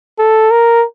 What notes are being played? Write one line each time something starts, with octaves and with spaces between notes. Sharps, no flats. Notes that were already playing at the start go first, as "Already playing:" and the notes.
A4
A#4